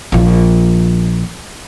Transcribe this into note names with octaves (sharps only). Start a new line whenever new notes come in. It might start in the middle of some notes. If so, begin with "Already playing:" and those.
A#1 F3